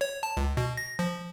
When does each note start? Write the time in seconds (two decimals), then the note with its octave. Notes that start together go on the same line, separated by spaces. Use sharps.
0.01 C#5
0.23 A5
0.37 C#2
0.57 B2
0.77 A#6
0.99 F3